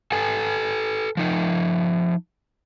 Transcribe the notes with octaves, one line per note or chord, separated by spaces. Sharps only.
A4 B4 G#5
F3 D#4